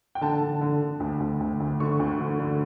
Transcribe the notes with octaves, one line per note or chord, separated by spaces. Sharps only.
G5
D3 A5
D3
D3
D3
D2
D2
D2
D2
D3 C#6
D2
D3
D3